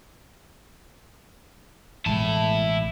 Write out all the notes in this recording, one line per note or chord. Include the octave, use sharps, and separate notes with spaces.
A1 B2 G#3 E4 A5